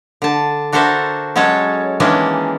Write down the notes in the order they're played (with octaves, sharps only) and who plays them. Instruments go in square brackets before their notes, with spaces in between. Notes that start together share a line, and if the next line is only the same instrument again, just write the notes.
[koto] D3 A5
D4 F#4 A4 A#4 C5 E5
F#3 G#3 C#4 A4 C#5
D#3 E3 G#3 A#3 C#4 D4